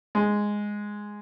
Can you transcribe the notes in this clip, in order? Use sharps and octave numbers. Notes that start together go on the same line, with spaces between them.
G#3